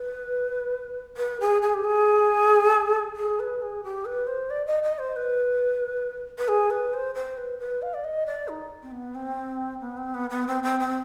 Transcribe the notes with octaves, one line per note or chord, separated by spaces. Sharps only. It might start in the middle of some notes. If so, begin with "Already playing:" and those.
Already playing: B4
B4
G#4
G#4
G4
G#4
G#4
B4
G#4
G4
B4
C5
D5
D#5
D#5
C5
B4
B4
G#4
B4
C5
C5
B4
B4
F5
D5
D#5
D5
D#4
C4
B3
C4
B3
C4
B3
B3
C4
C4
C4